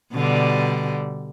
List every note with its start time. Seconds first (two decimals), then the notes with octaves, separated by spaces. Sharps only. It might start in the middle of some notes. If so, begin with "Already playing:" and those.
0.13 B2 D3 G3